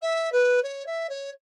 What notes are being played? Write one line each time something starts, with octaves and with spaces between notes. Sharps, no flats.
E5
B4
C#5
E5
C#5